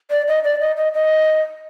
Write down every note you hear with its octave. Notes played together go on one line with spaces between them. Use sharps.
D5
D#5
D5
D#5
D#5
D#5